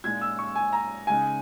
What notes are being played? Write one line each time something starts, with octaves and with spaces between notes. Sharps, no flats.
A#2 G#3 D#4 G#6
E6
C#6
G#5
A#5
C#3 G#3 D#4 G#5